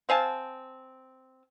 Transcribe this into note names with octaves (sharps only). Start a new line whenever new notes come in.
C4 F5 G#5 A5